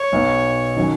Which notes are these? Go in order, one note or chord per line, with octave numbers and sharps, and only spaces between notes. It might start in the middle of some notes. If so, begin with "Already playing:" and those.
Already playing: C#5
B1 B2 F#3 B3
D#3 F#3 C#4